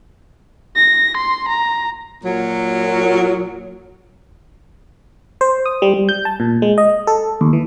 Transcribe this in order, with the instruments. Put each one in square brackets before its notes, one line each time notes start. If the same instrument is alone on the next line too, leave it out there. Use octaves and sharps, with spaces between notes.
[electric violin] A#6
C6
A#5
[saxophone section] A#2 F#3
[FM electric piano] C5
D#6
G3
G3
G6
A5
A#2
G#3
D#5
A4
D#2
E3